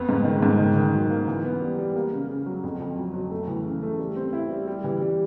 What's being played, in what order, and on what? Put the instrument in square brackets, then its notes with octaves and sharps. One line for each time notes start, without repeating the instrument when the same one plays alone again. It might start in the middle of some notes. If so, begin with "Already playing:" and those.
Already playing: [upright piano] F2 B3
G#2
D#3
G#2
D#3
D#3
F#3
A#3
E3
B3
G3
G3
A#3
C#3
C#3
F#3
F2
F2
F#3
F#3
A3
E3
C#3
A3
G3
C4
E4
G3
G3
E3
G3